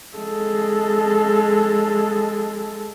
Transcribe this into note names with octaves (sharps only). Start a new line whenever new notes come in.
G#3 A4